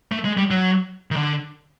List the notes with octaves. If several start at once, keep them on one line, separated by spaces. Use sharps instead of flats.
A3
G#3
G3
F#3
D#3
D3